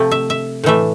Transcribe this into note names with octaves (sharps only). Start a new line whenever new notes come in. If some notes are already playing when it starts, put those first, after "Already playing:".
Already playing: C3 F3 A3
E5
E5
A2 E3 A3 E5